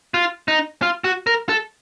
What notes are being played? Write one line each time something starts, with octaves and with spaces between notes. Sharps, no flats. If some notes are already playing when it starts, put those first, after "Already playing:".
F4
D#4
F4
F#4
A#4
A4